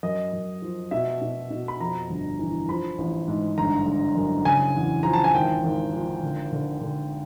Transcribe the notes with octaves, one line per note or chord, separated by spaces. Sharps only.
F#2 D#5
F#2
F3
B2 E5
B2
B2
B5
F2 A#5
G1
E3
F3 B5
A1
G#2
G1 A#5
G1
F#2
C#3 G#5
E2
F3 A#5
A5
G#5
G#1 G5
G#1
F3
D3
D3
D3